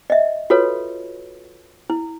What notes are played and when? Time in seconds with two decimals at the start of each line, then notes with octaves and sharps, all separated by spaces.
0.10 D#5 E5
0.50 F4 F#4 A4 B4 C#5
1.90 E4